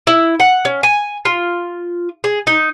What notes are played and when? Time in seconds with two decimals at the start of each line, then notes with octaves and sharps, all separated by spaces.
0.07 E4
0.40 F#5
0.65 C#4
0.83 G#5
1.25 F4
2.24 G#4
2.47 D#4